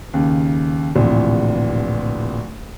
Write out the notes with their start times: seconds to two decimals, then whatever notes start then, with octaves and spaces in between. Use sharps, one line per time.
0.14 D#2 C#3
0.95 D1 A#1 C3 E3 F4